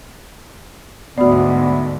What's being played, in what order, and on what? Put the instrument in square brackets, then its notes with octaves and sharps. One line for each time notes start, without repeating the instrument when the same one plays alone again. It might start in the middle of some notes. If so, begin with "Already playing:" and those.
[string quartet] D2 G#2 [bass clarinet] B3 [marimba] F#4 D5